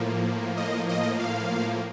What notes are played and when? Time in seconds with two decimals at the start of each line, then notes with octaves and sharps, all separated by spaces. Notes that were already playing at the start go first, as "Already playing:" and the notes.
Already playing: A2 F3 A#3
0.57 D#5
0.89 D#5
1.20 F5